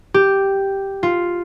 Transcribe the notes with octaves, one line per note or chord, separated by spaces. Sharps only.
G4
F4